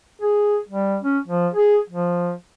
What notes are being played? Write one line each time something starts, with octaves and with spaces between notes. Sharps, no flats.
G#4
G3
C#4
F3
G#4
F3